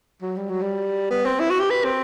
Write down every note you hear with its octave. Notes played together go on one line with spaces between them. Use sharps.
F#3
G3
F#3
G3
B3
C4
E4
F#4
G4
B4
C4